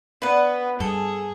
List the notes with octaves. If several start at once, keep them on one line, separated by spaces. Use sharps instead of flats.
B3 D4 B4 F#5
G2 G#4 A4